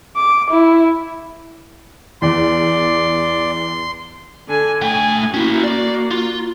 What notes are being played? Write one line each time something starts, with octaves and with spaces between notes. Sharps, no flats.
D6
E4
E2 D5 C6
D3 G#5
A3 G5 G#5
A#3 C#4 E4 F#4
D5
F4